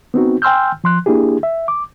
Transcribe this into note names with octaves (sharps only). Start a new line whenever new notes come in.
B3 C4 D#4 F#4
G5 G#5 C6 E6 F6 G6
F3 C6 F#6
A#3 D4 E4 G4 G#4
E5
D6